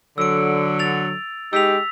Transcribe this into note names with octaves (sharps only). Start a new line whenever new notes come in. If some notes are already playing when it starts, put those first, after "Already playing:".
D3 F#3 E6 D7
A6 F7
G#3 D#4 G4 E6 B6 F7